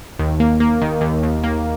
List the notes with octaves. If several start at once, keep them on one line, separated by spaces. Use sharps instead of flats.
D#2
A#3
A#3
D#3
D#2
D#2
A#3